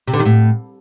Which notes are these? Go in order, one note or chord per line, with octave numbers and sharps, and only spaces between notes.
C3
D3
D#3
A2